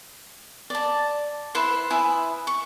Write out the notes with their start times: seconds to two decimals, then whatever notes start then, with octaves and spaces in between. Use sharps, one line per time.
0.70 D5 A5
1.55 E4 B4 C5 C6
1.90 E4 B4 G#5 D#6
2.47 C#6